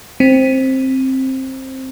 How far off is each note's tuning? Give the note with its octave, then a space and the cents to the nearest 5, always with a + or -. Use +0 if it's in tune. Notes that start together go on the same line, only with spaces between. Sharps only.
C4 +10